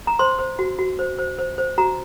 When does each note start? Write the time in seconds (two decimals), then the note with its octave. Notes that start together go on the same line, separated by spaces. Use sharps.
0.07 A#5
0.19 C5 C6
0.39 C5
0.59 F#4
0.79 F#4
0.99 C5
1.19 C5
1.38 C5
1.58 C5
1.78 F#4 A#5